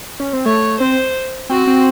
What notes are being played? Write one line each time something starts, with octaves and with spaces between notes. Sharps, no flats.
C#4
C4
A3 C#5
C4 C5
C4 F#4
C4